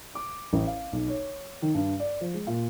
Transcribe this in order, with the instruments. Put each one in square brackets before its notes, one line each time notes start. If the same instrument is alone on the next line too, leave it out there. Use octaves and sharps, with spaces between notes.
[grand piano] D6
A1
F5
B1
C#5
D#3
G2
D5
F3
G#3
A#2